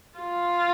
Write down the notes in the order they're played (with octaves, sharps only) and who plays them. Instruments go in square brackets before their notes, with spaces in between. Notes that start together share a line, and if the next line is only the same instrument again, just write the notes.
[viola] F4